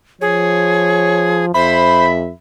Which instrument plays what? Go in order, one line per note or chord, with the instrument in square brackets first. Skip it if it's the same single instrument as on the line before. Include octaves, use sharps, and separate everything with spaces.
[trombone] F3 [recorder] G#4 [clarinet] C#5
[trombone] F2 [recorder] C5 [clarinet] E5 [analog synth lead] B5